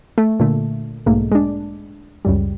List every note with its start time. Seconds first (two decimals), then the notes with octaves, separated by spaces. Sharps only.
0.18 A3
0.40 A#2 D3 A3
1.06 B1 G#2 A3 A#3
1.32 G#3 D4
2.25 C#2 F#2 G3